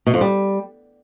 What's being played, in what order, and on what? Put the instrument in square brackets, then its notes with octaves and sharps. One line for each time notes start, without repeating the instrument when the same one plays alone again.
[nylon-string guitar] B2
F2
G3